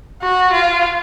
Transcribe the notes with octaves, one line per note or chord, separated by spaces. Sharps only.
F#4
F4